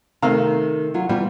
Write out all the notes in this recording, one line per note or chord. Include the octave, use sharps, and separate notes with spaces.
C3 D#3 A3 F5 A#5
F#3 F4
E3 G3 B3 F4